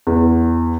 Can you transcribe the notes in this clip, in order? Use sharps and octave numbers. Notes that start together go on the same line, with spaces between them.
E2